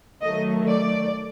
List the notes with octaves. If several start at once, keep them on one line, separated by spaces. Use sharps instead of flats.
D#3 F#3 A3 D#5
D5